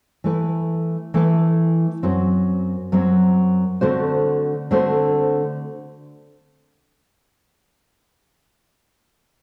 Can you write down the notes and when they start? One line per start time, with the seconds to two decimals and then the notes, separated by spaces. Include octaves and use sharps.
0.24 E3 A3 E4 B4
1.14 E3 A3 E4 B4
2.03 F#2 F#3 C4 F#4
2.92 F#2 F#3 C4 F#4
3.81 D3 A3 C4 F#4 C5
4.71 D3 A3 C4 F#4 C5